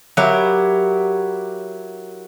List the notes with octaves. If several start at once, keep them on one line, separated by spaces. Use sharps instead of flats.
F#3 E4 G4 A#4